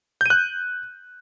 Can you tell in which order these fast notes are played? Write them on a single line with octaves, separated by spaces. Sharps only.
G6 D#7 F#6